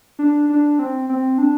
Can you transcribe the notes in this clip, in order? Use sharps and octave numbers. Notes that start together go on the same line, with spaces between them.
D4
D4
C4
C4
D4